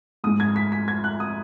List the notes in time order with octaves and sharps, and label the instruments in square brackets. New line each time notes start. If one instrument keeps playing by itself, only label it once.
[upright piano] G#2 G#3 D#6
G#6
B6
B6
G#6
F#6
D#6